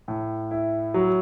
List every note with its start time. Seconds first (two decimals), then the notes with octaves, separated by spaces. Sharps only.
0.08 A2
0.51 E4
0.94 F#3